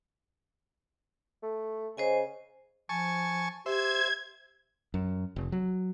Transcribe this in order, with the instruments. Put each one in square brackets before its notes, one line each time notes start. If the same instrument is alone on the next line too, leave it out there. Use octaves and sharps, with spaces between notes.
[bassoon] A3
[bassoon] C#3 [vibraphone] C5 D#5 G#5
[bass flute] F3 [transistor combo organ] G#5 A5 C#6
[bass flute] G4 [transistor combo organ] C5 E5 [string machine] G#6
[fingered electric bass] F#2
F1
F#3